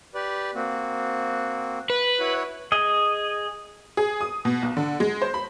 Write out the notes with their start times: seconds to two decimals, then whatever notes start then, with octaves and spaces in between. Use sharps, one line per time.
0.15 G4 B4 D5
0.55 A#3 C4 F#4
1.90 B4
2.20 E4 F#4 C#5
2.72 G#4 D#5
3.97 G#4
4.21 D#6
4.45 B2
4.63 B1
4.77 D3
5.00 G#3
5.22 C5
5.34 B5